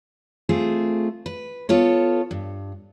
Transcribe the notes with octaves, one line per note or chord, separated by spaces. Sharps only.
A3 C4 F4 G#4
B4
B3 F4 A4 C#5
G2